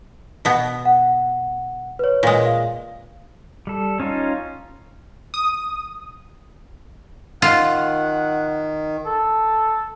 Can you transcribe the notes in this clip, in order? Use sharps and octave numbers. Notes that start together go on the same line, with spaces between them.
B2 B3
F#5
B4 C#5
A#2 G#3
F5
G3 A4
C#4 D#4 F4
D#6
D#3 F4 F#5
A4